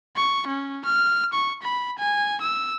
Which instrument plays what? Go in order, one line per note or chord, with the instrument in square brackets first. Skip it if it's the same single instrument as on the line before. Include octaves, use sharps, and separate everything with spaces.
[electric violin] C#6
C#4
F6
C#6
B5
G#5
E6